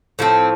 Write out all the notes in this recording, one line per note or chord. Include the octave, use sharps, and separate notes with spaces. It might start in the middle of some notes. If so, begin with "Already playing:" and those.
A2 F3 C4